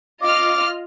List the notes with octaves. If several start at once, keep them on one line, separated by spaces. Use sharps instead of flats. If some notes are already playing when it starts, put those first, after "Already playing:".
F4 D#5 D6 F6